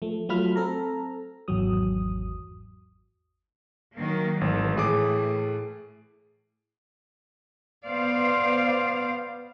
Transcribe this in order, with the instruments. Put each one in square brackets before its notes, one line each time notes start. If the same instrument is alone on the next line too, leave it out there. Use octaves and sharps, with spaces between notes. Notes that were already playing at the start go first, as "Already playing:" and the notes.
[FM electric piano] F3 A3
F#3 A3 F4 B5 F6
C4 A4 A#5
G#1 E2 F#3 D#6
[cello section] D#3 F#3 A#3
[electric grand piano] G#1 [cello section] E3 A3
[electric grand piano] A2 G#4 D6
[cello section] B3 C5 D5 F5